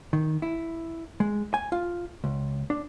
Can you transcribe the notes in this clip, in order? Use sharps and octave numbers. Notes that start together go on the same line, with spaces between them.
D#3
E4
G#3
G#5
F4
C#2
D4